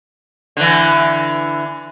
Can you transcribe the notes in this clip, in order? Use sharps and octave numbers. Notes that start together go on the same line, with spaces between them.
D3 E3